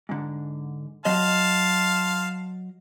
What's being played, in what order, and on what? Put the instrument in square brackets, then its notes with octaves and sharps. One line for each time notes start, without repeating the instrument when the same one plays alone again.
[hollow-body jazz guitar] G#2 D3
[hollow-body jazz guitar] F#3 D#5 [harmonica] F5 A5 C6